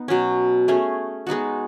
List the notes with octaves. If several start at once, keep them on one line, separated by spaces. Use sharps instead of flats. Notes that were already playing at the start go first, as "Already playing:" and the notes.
Already playing: B3 D#4
B2 F#3 C#4
A3 C#4 G#4
G#3 B3 D#4 F#4